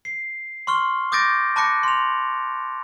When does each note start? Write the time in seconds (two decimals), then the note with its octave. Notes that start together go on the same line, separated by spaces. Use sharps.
0.05 C7
0.67 C6 C#6 F6 G7
1.12 D6 D#6 G6 A6 A#6 D7
1.56 A5 B5 D6 F#6 A#6 C#7
1.83 C6 F7